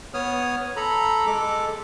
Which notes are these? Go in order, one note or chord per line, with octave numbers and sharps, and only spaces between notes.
B3 C#5 D#6 F6
A4 A#5 B5
G#3 A4 D6